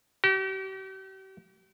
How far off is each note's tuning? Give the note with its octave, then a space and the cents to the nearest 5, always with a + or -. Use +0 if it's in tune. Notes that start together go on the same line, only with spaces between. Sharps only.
G4 -40